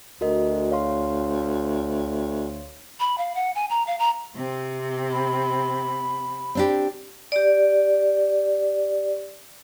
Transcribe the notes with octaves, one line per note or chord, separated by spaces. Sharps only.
D2 F#4 A#4 D#5
C#5 F5 C6
B5
F5
F#5
G#5
A#5
F5
A#5
C3 C4
B5
C4 D4 G4
G4 D5